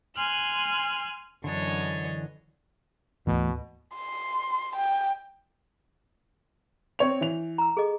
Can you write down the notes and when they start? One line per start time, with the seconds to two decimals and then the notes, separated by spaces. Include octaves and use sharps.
0.16 G#5 C6 F6 F#6
1.44 F#2 D3 E3 D4 C#5 D#5
3.27 D2 G#2 B2 E3 A3
3.95 C6
4.75 G5
6.99 C4 C#5 F7
7.21 E3 F7
7.58 A#5 E6
7.77 G#4 A4 D#5